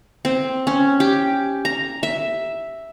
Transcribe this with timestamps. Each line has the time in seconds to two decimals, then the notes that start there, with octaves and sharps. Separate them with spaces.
0.25 C4
0.67 C#4
1.00 G4
1.65 A#5
2.03 E5